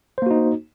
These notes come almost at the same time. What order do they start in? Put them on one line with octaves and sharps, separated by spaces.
C5 A#3 F#4 D#4